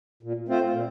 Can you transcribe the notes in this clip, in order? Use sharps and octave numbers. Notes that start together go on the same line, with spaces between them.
A#2
A3 C4 F4 C5
A#2